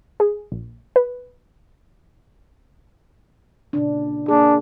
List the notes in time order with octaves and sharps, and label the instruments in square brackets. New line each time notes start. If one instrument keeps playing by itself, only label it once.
[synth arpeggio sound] G#4
A#1
B4
[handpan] A#2 C#3 D4
[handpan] A#3 G#4 [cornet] D4